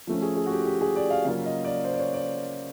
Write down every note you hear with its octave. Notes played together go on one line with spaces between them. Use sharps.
F3 A3 C#4
G#4
G#4
F#4
G4
G4
G#4
D5
F5
C#3 F#3 A#3 C#4 F4 F5
D#5
D5
C5
D5
C#5
D5